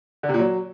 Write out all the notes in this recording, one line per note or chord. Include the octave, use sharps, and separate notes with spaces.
D3
C3
A#2
F#3